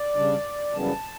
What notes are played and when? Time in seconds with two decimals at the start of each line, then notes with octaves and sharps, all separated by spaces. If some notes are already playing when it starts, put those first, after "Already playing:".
Already playing: D5
0.16 C#3 G3 D4
0.72 F#2 C#3 E3 G3 B3 A5